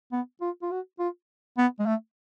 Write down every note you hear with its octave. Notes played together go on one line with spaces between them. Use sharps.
B3
F4
F4
F#4
F4
B3
G#3
A3